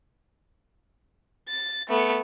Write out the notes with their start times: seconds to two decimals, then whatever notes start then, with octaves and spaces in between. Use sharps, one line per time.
1.49 A6
1.89 A3 B3